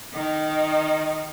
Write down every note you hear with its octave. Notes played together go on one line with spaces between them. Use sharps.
D#3 D#4